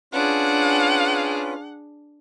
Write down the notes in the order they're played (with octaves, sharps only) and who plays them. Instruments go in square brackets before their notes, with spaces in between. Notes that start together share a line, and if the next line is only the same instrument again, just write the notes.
[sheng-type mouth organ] C#4 F4 B4 [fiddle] D4 G#4 [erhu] F#5